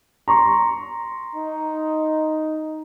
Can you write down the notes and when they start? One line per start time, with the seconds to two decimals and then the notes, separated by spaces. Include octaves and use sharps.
0.28 A#5 C6 C#6
1.36 D#4